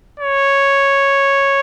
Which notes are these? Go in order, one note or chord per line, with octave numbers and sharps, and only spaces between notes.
C#5